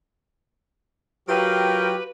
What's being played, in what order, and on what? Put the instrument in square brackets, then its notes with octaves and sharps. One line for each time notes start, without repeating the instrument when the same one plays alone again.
[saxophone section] F#3 F4 [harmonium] G4 [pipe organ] A#4 G5 [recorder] B4